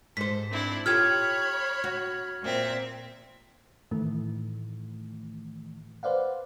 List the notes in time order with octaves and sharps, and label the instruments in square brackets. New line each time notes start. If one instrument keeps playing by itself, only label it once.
[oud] G#2 C5 [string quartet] A4 [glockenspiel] B6
[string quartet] C4 D4 E4
[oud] F4 G4 A4 [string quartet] C#5 B5 [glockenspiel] F6 G#6
[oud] F#4
[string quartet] A#2 C4 E5
[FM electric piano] A2 D#3 E3 A3
B4 C5 D5 F5 F#5